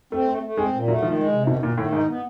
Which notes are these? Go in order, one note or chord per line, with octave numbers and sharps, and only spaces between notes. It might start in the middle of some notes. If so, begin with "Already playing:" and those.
A3 C4
A3
A3
G#3 C4
A#2
F#3 A3
D#3 F3
G#3
C3
B2 D#3
A#2 D#3
A2 D#3
G#2 D#4
B3